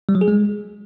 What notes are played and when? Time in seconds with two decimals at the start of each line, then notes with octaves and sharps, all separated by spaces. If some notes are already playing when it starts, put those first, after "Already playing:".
0.09 G3
0.15 F#3
0.21 G#4
0.28 G#3